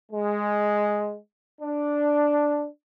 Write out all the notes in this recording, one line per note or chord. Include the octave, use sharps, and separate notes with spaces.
G#3
D4